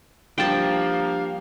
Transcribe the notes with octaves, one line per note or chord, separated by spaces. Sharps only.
F3 G3 A#3 D4 G4 F5 G5 A5